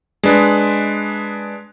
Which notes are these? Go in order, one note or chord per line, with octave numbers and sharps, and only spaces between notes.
G#3 D4 B4